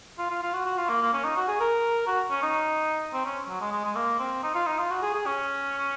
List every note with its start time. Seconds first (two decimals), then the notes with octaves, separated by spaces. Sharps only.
0.18 F4
0.30 F4
0.43 F4
0.53 F#4
0.66 F#4
0.78 F4
0.89 A#3
1.02 A#3
1.14 C#4
1.24 D#4
1.37 F#4
1.48 G#4
1.61 A#4
2.07 F#4
2.30 C#4
2.43 D#4
3.13 C4
3.25 C#4
3.49 F#3
3.61 G#3
3.72 G#3
3.84 G#3
3.95 A#3
4.19 C4
4.43 D#4
4.55 F4
4.67 D#4
4.78 F4
4.90 F#4
5.03 G#4
5.15 G#4
5.26 C#4